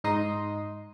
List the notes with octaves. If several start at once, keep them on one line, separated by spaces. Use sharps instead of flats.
G#2 D#4 D#5 C6 D#6